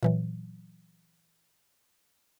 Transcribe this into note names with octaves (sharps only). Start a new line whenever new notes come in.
A#2 E3 F#3